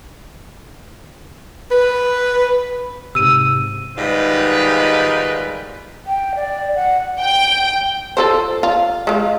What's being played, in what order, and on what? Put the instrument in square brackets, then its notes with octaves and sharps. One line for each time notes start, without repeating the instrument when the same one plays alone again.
[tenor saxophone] B4
[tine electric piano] G#2 C3 [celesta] E6 D#7
[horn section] G#2 D#3 G3 F4 B4
[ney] G5
D5
F#5
[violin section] G5
[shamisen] F4 A4 C5
F4
G#3 F4